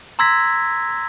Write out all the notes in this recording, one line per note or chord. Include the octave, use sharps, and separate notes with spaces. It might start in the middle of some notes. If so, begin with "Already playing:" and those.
A#5 C6 E6 G#6 A#6 B6